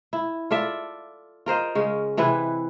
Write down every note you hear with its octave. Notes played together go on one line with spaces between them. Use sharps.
E4
F4 A4 D5 E5
F4 A#4 C5 D#5
C#3 G#3 C#4
C3 E3 E4 B4